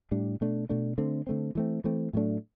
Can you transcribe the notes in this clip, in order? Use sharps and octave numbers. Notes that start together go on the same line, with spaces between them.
A2 G3 D4
B2 A3 D4
B2 A3 D4
D3 A3 C4
D3 A3 C4
E3 A3 C4
E3 A3 C4
A2 F#3 A3 D4